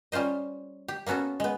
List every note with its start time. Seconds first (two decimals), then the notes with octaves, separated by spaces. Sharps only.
0.12 G3 C#4 F4 C5 D#5
0.88 G4
1.06 A#3 B3 C#4 F#4 A4
1.40 G#3 B3